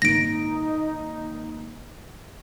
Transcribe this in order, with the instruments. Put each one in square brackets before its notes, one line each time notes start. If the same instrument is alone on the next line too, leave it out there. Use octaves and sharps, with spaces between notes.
[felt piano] G#1 A#2 [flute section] D#4 [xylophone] A#6 D7